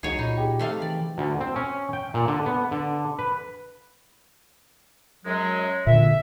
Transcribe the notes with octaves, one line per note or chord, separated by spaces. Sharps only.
C#2 D#4 F#4 G#4 C#5
A#2 D#4 B5
G4 G#4
C3 A3 F5
E3 D5
D2
C4
C#4
G5
A#2
D3
B3
D3
B4
F#2 F#3 G#3
A#2 D3 E5